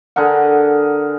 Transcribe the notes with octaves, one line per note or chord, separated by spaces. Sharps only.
D3 G#4 A#4 F#5